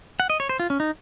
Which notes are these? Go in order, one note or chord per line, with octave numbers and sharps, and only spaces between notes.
F#5
D#5
C#5
C5
F4
C#4
D#4